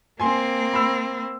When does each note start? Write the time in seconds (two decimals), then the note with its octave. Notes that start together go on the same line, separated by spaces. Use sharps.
0.20 A#3 C4 G#5 C6
0.73 B5 E6